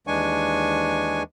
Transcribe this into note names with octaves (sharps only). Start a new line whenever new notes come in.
D#2 E3 G#3 D4 G#5 C#6